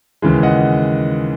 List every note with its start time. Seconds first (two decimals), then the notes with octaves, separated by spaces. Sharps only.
0.22 D#2 C#3 E3 G#3
0.43 D#5 F#5